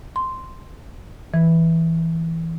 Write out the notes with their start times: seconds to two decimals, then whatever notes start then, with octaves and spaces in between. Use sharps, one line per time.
0.16 C6
1.34 E3